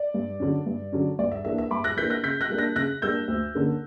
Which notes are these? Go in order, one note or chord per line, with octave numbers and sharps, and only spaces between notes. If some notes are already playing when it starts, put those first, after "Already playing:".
Already playing: D5
G2
D3 F#3 C#4
G2
D3 F#3 C#4
G2 D5
E5
E3 A#3 D4 E5
E5
G2 B5 D6
F#6 A#6
E3 A#3 D4 G6 B6
F#6 A#6
C#3 G6 B6
F#6 A#6
G3 A#3 D4
F#6 A#6
C#3 F#6 A#6
G3 A#3 D4 E6 G6
D2
D3 A#3 C#4